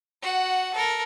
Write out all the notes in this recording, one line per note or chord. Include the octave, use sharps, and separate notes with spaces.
F#4 F#5
A4 A#4